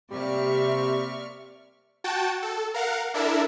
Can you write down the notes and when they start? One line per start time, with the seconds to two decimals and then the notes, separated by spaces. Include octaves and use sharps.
0.11 C3 G3 A#3 D5 E5 C#6 F6
2.04 F#4 G5 A5
2.42 A4
2.74 A#4 F5 F#5
3.14 D4 E4 A4 A#4 E5